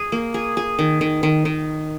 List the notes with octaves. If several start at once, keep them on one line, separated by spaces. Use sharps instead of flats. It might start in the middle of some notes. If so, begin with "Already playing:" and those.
Already playing: G#4
A#3
G#4
G#4
D#3
D#3
D#3
D#3